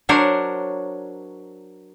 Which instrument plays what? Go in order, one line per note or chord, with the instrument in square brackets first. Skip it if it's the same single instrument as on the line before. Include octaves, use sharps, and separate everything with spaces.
[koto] F#3 D4 A#4 C5 C#5